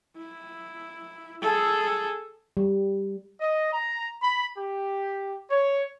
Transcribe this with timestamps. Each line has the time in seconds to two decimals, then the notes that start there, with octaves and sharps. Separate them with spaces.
0.16 E4
1.42 G#4 A4
2.57 G3
3.41 D#5
3.72 A#5
4.22 B5
4.57 G4
5.50 C#5